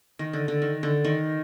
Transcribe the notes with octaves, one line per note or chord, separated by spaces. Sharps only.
D#3
D3
D3
D#3
D3
D#3